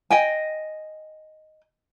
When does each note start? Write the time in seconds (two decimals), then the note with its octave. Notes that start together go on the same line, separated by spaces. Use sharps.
0.10 D#5 G5 G#5